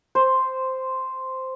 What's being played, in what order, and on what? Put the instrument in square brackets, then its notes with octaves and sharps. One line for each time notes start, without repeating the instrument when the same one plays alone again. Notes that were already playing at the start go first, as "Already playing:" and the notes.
[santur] C5